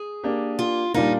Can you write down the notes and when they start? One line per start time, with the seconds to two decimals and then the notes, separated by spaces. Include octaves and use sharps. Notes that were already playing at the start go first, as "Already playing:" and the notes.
Already playing: G#4
0.24 A#3 D4 G4 A#4
0.59 F4
0.94 A#2 G3 D4 D#4 F4 A#4